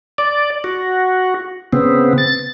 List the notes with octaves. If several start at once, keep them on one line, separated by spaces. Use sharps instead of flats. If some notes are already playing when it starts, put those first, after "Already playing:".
D5
F#4
C#3 B3 C4
A6